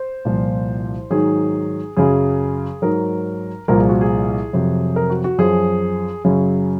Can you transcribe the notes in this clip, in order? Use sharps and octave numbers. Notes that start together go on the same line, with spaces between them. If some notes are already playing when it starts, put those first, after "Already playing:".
Already playing: C5
C2 A#2 F3
G#2 D#3 F#3 G#4
F#2 C#3 F#3 G#4
G#2 F#3 A#4
C2 A#2 F3 A#4
G#4
F#4
G#4
F2 C3 F#3
A#4
F#4
F#4
F#2 F3 G#4
F#2 C#3 F#3 G#4